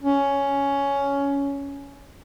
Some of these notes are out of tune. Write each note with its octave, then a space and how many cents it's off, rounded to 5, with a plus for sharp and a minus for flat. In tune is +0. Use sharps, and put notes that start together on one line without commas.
C#4 +10